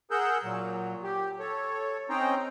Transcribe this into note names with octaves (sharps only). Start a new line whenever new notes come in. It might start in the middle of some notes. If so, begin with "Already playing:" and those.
G#4 A#4 F#5 E6 G6
A#2 F#3
G4
A4 C#5
C4 C#4 D#4 C5 G5 A#5